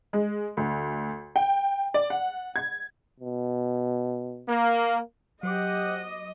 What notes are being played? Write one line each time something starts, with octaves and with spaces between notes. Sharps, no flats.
G#3
D2
G5
D5
F#5
G#6
B2
A#3
F#3 G4 C5 D#5 F#5 D6